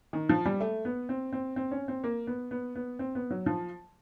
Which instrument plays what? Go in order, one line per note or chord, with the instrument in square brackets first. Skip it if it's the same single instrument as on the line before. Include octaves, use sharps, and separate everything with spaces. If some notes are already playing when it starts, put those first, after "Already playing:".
[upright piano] D#3
F3
G3
A3
B3
C4
C4
C4
C#4
C4
A#3
B3
B3
B3
C4
B3
F#3
F3